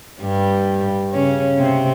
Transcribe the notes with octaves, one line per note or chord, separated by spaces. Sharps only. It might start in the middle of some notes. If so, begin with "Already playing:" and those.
G2 G3
C#3 C#4
C3 C4